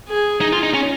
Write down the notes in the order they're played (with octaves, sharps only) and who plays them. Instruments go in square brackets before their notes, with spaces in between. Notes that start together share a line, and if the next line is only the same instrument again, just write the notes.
[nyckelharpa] G#4
[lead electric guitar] D#4
F4
D#4
C#4